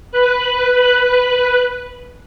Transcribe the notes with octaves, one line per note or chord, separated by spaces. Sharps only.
B4 F#6